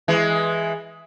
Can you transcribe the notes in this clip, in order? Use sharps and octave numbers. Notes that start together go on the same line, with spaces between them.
E3 G#3